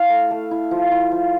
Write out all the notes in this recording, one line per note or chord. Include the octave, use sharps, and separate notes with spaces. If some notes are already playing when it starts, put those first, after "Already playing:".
Already playing: E4 F5
A3
A3
E4
F3
E4
F3